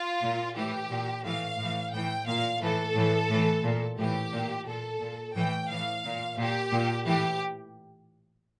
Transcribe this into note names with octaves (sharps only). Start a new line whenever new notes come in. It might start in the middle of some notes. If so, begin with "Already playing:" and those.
Already playing: F4
A#2
A2 E3 G4
A#2
A2 E3 F5
A2 E3
A2 E3 G5
A#2 F5
A2 E3 A4
A2 E3
A2 E3
A#2
A2 E3 G4
A#2
A#2 A4
A#2
A2 E3 G5
A2 E3 F5
A#2
A#2 G4
A#2
A2 E3 G4